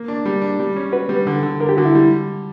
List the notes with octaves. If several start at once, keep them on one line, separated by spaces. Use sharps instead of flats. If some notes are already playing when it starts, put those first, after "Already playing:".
Already playing: A#3
D4
G3
D4
G3
C#4
F#4 B4
G3
D3
D3
D3 A#4
G4
D3 F#4
E4
G3